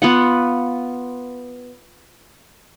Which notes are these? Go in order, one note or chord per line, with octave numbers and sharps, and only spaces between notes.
B3 F4 F#5